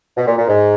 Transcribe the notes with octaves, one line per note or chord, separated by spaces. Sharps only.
B2
A#2
A#2
G#2